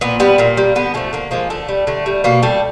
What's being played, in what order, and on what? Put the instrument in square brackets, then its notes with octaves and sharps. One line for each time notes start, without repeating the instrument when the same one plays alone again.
[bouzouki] A#2 B3
G3 B3
A#2 A#3
G3
D3 B3
F3 G#3 A3
D3 A#3
F3 G#3 A#3
D3 A3
G3
D3 A3
G3
B2 A#3
G3 A3